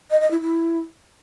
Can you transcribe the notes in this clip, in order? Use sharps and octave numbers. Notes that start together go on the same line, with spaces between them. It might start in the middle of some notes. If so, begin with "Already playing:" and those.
D#5
D#5
E4
E4